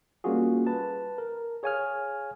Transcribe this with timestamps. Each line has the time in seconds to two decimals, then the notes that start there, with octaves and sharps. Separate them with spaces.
0.24 G3 A#3 C#4 F4 F#4 G#4
0.67 B4 A5
1.18 A#4
1.63 G#4 C#5 F5 G#5 D#6 F6